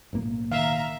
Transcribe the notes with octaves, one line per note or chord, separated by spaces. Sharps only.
B1 A2 A#3
D#3 E5 F5 A#5